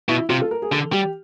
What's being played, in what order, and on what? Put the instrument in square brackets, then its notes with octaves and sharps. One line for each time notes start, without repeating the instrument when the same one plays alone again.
[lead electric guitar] B2 [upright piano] E4
[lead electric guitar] C3 [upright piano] F4
[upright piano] A4
A#4
G#4
[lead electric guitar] D3 [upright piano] A4
[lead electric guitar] G3 [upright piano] G4